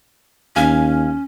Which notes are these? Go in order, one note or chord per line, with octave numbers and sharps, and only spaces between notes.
D#2 C#4 F5 G#5